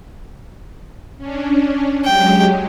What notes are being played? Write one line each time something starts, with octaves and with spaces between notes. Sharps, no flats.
C#4 D4
F#3 G#3 G4 G5